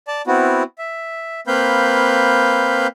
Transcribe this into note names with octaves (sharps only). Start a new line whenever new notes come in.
D5 A5
B3 C4 E4 F#4
E5
A#3 C4 B4 F5 B5 G6